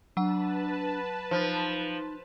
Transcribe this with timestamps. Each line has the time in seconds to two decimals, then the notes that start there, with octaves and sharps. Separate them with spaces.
0.17 F#3 D4 B4 F#5 A5
1.31 F3 D#4